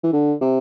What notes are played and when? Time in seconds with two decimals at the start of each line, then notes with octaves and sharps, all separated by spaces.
0.03 E3
0.13 D3
0.41 C3